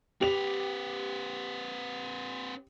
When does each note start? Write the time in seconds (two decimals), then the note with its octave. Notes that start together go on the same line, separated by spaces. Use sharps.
0.21 C4 G4 B4 F7